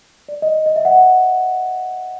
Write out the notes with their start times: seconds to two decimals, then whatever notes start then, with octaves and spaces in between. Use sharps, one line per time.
0.29 D5
0.42 D#5
0.66 D#5
0.76 E5
0.85 F#5